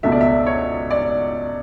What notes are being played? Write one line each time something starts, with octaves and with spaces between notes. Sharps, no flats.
C#2 B2 A3 E5
D5
E5
C#5
D5